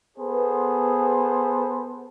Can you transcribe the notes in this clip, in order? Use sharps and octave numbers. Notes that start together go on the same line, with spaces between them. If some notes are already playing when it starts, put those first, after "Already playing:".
B3 G#4 A4 B4 C5